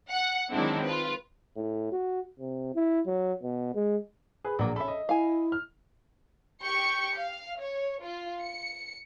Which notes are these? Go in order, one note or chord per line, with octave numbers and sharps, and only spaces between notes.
F#5
D#3 F#3 G#3 C4 D4 E4
F4 B4
A2
F#4
C3
E4
F#3
B2
G#3
G#4 B4
A#1 F#3 A#3
C#4 A4 E5 B5
D#5
E4 F5 G#5
F6
G4 C#6 G6 C#7
F5
C#5
F4
C#7